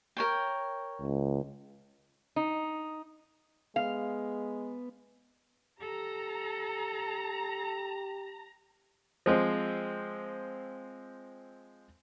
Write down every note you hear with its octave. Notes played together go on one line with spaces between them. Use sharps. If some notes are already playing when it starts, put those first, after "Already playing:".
A#4 C#5 G5
C#2
D#4
G#3 B3 F5
G4 A4 A#5
F3 G#3 C4